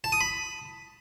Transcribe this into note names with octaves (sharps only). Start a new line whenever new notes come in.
A5
D#6
B5